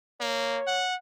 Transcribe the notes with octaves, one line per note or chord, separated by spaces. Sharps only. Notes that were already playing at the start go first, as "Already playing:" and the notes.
A#3 C#5
F#5